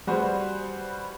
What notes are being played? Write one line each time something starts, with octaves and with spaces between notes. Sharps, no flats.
G3 F#4 G#4 B4 C5